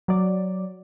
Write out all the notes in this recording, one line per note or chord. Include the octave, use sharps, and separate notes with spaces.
F#3 D5